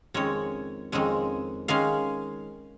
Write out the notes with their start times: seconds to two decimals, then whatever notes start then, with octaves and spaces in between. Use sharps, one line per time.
0.14 F2 D#3 G#3 C#4 C#5
0.92 F2 D#3 G#3 C#4
1.68 D#3 G#3 C#4 F5